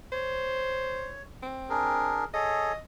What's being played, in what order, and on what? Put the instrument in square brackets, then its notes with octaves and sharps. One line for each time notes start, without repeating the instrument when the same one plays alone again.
[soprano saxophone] C5 [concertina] C#5
[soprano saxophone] C4
[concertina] D4 G#4 A#4
[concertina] G#4 A4 C#5 [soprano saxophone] D#5